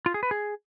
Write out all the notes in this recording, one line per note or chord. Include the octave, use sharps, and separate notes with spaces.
F4
G#4
B4
G#4